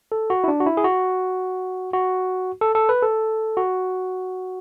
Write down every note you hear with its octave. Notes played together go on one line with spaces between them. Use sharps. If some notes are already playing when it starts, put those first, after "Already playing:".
A4
F#4
E4
D4
F#4
E4
G#4
F#4
F#4
A4
A4
B4
A4
F#4